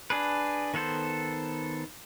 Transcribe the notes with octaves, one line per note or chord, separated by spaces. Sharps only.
D4 G#4 B4
D#3 B3 A4 C5